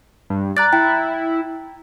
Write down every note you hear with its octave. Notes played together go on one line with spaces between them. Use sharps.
G2
D5 A#5 F#6 A6
E4 G5